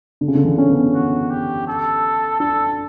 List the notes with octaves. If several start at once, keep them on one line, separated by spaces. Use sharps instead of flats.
D3
C#3
D3
E3
C#4
B3
F#4
G4
A4
D4 A4